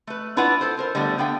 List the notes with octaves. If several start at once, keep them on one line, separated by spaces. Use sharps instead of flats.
A3 B4
D4 E4 F4 B4 D5 F#5
A4 C5
F4 A#4 C5
D3 G3 A3 B3 D5
D3 B3 F5 G5